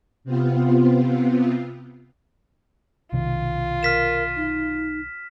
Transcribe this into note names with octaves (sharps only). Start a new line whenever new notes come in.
C3 B3 C4 F4
B1 C3 D#3 F4
A#4 F6 B6 E7
D#4